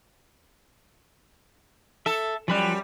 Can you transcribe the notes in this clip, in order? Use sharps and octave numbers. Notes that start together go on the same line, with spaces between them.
A4 E5 A5
F#2 F3 G3 B5 F#6